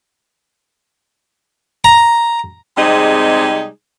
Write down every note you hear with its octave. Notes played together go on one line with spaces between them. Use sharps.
A#5
C3 G3 G#3 C4 D#4 G#4